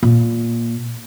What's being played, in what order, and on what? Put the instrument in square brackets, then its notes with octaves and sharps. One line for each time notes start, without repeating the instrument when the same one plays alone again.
[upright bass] A#2